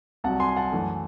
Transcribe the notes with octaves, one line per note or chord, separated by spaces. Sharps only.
C2 C3 F#3 F#5 A5
G#5 C6
F#5 A5
F#2 E3 A3